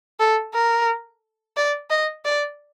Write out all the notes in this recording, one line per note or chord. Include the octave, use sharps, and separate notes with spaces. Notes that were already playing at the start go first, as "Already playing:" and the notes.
A4
A#4
D5
D#5
D5